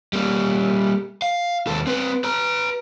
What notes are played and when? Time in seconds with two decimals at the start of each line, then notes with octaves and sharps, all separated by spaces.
0.13 G3 A#3
1.22 F5
1.67 D#2 A4
1.87 C4 B4
2.24 B4 A#5